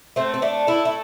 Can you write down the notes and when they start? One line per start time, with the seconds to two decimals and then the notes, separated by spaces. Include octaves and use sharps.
0.16 A3 C4
0.34 C4
0.42 A3 D4
0.67 A3 E4
0.85 E4